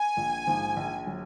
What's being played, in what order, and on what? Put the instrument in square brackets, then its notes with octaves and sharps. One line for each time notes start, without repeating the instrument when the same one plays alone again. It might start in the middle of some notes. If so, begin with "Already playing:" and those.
Already playing: [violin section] G#5
[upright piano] A#1
G#2 F3
A#1
F#3